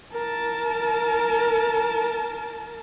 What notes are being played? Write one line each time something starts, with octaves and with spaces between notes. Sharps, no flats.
A#4 A5